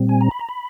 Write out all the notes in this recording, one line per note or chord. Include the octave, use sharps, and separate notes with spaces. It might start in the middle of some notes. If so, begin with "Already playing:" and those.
Already playing: A#2 G3 C4
G#5
A#5
B5
A#5
B5